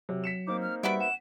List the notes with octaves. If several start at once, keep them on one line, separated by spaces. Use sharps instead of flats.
C3 F#3
B6 C#7 E7
A#3 C4 D#4 D6
F6
G3 B3 F#4 E5 D7
F#5 E7